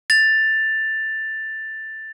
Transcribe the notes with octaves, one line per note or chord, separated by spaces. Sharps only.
A6 F7